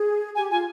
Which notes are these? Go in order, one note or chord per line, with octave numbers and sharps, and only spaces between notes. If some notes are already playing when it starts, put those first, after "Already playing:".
Already playing: G#4
G4 G#5
F4 G#5